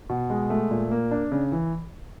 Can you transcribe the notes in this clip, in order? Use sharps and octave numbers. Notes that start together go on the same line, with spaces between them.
B2
G#3
A3
A#2
A#3
D4
C#3
E3